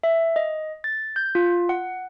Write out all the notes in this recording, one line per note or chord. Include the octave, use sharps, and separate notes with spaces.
E5
D#5
A6
G6
F4
F#5